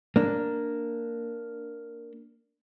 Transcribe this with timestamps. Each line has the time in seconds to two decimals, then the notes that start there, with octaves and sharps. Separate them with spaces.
0.16 A#3 D4